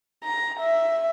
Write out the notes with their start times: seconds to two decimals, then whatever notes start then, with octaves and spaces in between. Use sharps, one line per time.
0.23 A#5
0.60 E5